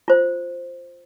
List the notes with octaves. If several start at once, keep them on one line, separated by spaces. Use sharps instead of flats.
F4 C5